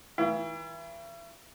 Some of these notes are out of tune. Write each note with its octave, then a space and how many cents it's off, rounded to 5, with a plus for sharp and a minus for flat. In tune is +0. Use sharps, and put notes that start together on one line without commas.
E3 -40 E4 +45